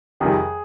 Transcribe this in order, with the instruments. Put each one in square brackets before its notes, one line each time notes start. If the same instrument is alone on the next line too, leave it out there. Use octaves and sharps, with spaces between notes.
[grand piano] F2 C3 D#3 G3 G#4